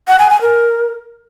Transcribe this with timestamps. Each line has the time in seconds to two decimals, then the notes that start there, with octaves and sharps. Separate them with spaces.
0.08 F#5
0.19 G#5
0.30 G#5
0.41 A#4